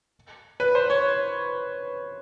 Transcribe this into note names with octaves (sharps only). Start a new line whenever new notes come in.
B4
C5
C#5